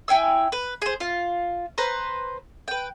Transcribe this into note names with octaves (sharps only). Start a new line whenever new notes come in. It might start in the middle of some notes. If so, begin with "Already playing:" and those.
E4 G5 G#5 E6
B4
G#4 C5
F4
B4 C5 A#5
B4 G5